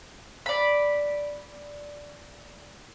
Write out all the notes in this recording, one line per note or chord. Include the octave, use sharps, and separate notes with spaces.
D5 B5